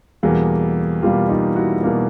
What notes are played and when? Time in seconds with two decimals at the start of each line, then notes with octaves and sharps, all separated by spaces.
0.23 E2 B2 G3 A#3 F#4 G#4
1.03 E2 B2 G3 A#3 F4 G4
1.29 D#4 F4
1.56 E4 F#4
1.83 B2 G3 A#3